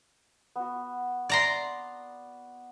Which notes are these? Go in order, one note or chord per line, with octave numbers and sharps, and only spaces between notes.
B3 F#4
D5 A#5 C6